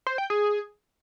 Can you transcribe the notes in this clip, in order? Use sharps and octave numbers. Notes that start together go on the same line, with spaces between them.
C5
G5
G#4